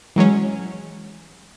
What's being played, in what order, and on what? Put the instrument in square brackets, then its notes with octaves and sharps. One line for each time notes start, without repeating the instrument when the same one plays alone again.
[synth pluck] E3 F#3 G#3 C#4